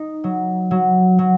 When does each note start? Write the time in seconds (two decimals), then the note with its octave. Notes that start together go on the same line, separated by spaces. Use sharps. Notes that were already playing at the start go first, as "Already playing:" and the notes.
Already playing: D#4
0.24 F#3
0.71 F#3
1.19 F#3